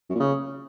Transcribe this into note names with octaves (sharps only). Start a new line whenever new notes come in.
F#2
A#2
C#3